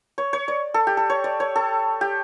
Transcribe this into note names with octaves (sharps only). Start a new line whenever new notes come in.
C#5
C#5
D5
A4
G4
A4
C#5
D5
C#5
A4
G4